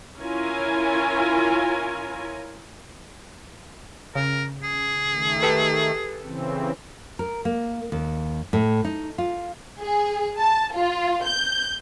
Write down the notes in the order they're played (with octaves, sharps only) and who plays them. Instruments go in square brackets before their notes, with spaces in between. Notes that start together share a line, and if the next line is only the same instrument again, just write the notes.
[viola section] C#4 E4 F4 A#4 C#5 G#5
[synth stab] C#3 [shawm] A#4
[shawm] G#4
[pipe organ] D#3 A3
[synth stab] G4 A4 B4
[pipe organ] C#3 E3 C4
[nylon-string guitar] A#4
A#3
D#2
A2
D#4
F4
[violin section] G#4
A5
F4
G6